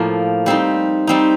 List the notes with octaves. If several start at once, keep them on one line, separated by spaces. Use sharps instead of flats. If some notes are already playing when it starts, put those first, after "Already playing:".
Already playing: A2 F3 A#3
G3 C4 D#4
G3 C4 D#4